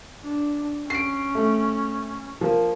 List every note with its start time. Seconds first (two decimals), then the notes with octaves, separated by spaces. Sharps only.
0.24 D4
0.90 C#4 C7 D7
1.35 A3
2.41 F3 A#3